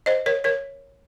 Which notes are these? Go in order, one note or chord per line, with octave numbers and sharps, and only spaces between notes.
C5 D#5
A#4 C#5
A#4 C#5